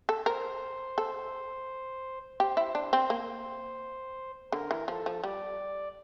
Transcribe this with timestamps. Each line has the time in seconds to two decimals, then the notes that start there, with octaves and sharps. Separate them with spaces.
0.09 A4
0.26 A#4 C5
0.98 A4
2.39 G4 C5
2.57 E4
2.75 D4
2.93 C4
3.10 A#3
4.52 D3 A#4
4.71 E3
4.88 F3 A4
5.06 F3
5.24 G3 D5